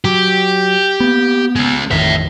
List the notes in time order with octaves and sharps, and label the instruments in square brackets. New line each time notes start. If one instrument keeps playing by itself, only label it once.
[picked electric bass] F#3 [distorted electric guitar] G4
[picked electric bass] A#3 B3
[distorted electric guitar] G#3 C#4
[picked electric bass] A1 F2 D#3 [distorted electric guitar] C#5 E5